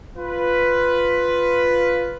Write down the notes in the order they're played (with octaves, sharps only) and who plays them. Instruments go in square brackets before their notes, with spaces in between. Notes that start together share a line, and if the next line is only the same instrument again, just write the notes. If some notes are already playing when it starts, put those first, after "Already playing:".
[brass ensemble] F4 B4